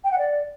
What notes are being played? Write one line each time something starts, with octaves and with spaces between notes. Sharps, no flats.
G5
F#5
D5